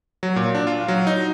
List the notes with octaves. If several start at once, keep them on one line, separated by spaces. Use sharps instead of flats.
F#3
A#2
D4
F4
F#3
D#4